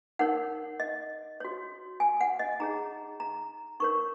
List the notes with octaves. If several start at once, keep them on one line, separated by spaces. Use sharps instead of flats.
D#4 A#4 C#5 F#5
D#5
F#4 C#5
G#5
F#5
D#5
D#4 G#4 C#5 A#5
A#5
D#4 A#4 C#5 C#6